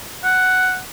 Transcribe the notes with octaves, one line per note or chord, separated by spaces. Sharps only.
F#5